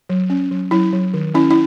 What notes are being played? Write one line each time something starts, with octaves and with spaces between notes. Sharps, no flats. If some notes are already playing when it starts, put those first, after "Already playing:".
F#3
C#4
F#3
F#3 E4
F#3
D#3
C#4 E4
E4